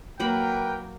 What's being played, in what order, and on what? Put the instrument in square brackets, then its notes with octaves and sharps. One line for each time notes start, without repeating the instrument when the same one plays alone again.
[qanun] F#3 A#3 B5 [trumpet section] A#4 B4 G5